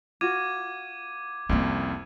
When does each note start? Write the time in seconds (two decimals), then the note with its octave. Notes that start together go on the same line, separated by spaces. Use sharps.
0.21 F4 F#4 D6 G#6 D#7
1.49 C2 F2 A#3 C#4